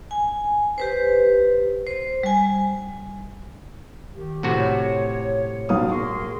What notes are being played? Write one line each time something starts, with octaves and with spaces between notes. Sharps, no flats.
G#5
G4 B4 C5
C5
G3 G#5
D#3 G4
A2 C3 F#4
C#5
B1 F5 D#6
G#4 A#4 C6 C#6